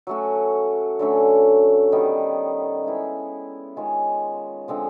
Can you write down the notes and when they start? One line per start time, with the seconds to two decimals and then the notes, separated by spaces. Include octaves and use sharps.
0.07 F#3 A3 C#4 F#4
0.99 D3 F#3 A3 C#4
1.92 D#3 G3 B3 D#4
2.84 G#3 B3 E4
3.76 D#3 G#3 C#4 F4
4.68 D3 F3 G#3 C4